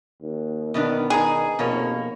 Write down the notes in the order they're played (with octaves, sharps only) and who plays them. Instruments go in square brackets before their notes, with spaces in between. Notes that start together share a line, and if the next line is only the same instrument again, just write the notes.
[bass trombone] D#2
[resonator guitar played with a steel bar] B2 B3 D4 [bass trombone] D#3
[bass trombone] D#3 [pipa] D#4 G#4
[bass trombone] F1 [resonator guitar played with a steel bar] B2 A#3 C#5